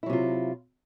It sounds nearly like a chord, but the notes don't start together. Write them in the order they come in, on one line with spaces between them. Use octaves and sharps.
E4 F#3 C3 F4